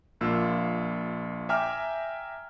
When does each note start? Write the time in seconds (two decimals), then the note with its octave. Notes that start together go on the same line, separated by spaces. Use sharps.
0.21 A#1 A#3 F4 E6
1.49 E5 G5 G#5 A#5 D6 F6